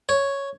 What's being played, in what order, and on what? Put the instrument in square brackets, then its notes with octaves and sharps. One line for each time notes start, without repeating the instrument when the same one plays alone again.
[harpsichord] C#5